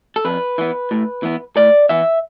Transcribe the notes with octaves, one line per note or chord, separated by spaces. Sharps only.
A4
F2 B4
E3 B3
A2
E3 B3
A2 D5
E3 B3 E5